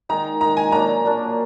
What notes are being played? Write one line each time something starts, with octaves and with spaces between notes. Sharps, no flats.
D#3 G#3 D#4 A#5
D#3 G#3 D#4 A#5
G#5
A#2 F#3 A#3 D4 A#5
A#2 F#3 A#3 D4